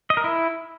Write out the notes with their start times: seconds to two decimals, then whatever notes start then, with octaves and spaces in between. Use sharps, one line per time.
0.10 D#5
0.17 A#4
0.24 E4